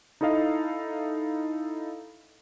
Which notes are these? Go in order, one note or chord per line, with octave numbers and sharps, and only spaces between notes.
D#4 E4 A4 D#5 F5